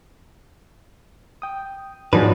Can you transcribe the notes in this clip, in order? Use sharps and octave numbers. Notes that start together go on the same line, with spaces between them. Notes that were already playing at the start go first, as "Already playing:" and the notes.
G5 D#6
E2 G#2 D#3 F3 F#3 D4 B4